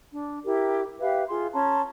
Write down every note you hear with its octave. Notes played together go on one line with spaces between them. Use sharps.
D4
E4 G4 A#4
G4 B4 E5 F5
F4 G#4 C6
C#4 A5 A#5 C6